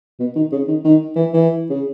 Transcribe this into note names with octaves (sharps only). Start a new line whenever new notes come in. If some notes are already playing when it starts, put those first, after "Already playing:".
B2
D#3
C#3
D#3
D#3
E3
E3
C#3